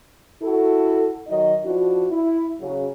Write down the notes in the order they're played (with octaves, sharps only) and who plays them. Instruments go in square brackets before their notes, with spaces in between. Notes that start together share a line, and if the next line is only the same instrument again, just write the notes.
[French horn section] E4 F#4 A4
D#3 F#3 D#4 D#5
F3 D4 E4 F#4
E4
C#3 F#3